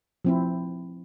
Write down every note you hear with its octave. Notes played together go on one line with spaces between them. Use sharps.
F3 C4 E4